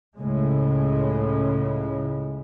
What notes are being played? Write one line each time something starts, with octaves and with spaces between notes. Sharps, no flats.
C#2 A2 C#3 G#3